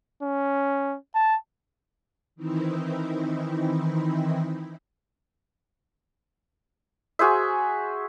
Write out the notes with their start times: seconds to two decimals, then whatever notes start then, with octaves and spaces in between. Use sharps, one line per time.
0.23 C#4
1.15 A5
2.36 D#3 E3 C4 D#4 E4
7.19 F#4 G#4 C5 E5